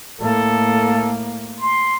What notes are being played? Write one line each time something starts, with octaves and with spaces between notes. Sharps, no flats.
A2 A#3 A4
C6